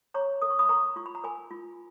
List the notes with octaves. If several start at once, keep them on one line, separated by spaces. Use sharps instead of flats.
C#5 A#5 C#6
A#4 D#6
C#6
B5 D#6
A#4 A#5 C#6
F4 C#6
B5
A#5
A#4 G#5 B5
F4